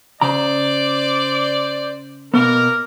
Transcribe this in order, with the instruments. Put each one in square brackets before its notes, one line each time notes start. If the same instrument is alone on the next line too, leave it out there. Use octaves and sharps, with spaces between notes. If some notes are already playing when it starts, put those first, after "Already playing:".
[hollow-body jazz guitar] C#3 A#5 [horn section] C5 D5
[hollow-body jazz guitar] B2 B3 [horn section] A#3 A#4